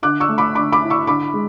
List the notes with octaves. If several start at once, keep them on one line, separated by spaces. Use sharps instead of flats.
D3 D6 F#6
C#6 E6
A3
B5 D6
D3 B5 D6
B5 D6
E4
C#6 E6
D3 B5 D6
G#3